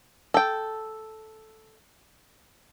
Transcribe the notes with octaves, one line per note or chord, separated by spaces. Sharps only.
A4 G5